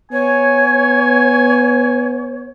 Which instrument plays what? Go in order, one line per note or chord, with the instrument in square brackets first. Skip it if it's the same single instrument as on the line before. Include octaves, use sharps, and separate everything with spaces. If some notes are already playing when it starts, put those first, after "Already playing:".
[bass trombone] B3 [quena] C#5 [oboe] G#5